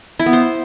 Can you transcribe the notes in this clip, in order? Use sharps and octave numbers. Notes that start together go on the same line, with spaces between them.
E4
B3
C5